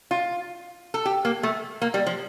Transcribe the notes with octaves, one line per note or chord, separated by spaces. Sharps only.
F4
A4
G4
A#3
A3
A#3
G3
F3